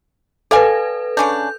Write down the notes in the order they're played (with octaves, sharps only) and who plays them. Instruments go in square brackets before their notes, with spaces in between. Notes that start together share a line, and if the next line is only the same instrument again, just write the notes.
[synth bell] A4 B4 [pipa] D5 F5 G#5
[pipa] C#3 C#4 D4 [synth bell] G6